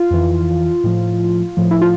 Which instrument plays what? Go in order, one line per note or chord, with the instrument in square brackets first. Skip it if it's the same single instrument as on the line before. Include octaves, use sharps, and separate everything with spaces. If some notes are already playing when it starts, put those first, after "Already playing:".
Already playing: [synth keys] F4
F2 E3
A2 F3
A2 F3
E4
F4